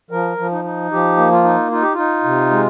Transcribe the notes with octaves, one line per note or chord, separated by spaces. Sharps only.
F3 A#4
F3
D#4
D#4
F3 G4
A#3
F4
D#4
D#4 F4
G4
D#4 F4
C3
G#3